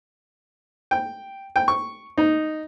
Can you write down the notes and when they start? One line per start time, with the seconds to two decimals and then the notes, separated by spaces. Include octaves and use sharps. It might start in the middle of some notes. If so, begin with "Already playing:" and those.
0.91 G5
1.56 G5
1.68 C#6
2.18 D#4